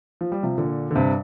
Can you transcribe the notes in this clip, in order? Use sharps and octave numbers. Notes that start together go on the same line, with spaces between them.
F3
G3
C3 F3
A#2 D3
D3
G2 C3